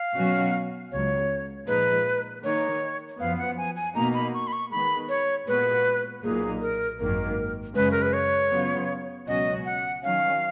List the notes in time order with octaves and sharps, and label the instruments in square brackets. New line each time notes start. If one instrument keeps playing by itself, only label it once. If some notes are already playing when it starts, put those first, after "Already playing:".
Already playing: [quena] F5
[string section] B2 F#3 C#4 F#4
[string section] C#2 C#3 F#3 [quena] C#5
[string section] A#2 F3 G#3 D#4 [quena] B4
[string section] D#3 A#3 D#4 A#4 [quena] C#5
[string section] F#2 F3 B3 [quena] F5
[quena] F#5
G#5
G#5
[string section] B2 A#3 D#4 [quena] A#5
[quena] B5
C#6
B5
C#6
[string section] D#3 G#3 B3 [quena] B5
[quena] C#5
[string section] A#2 G#3 B3 F#4 [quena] B4
[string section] B1 A#2 F#3 A#3 D#4 [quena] G#4
[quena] A#4
[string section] G#1 F#2 D#3 A#3 [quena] A#4
[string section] F#2 C#3 G#3 [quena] B4
[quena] A#4
B4
C#5
[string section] C#3 F#3 B3 F4
[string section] C#2 B2 F#3 C#4 F#4 [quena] D#5
[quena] F#5
[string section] D#3 F#3 C#4 [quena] F5